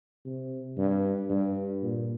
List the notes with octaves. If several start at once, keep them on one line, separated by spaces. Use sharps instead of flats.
C3
G2
G2
A#2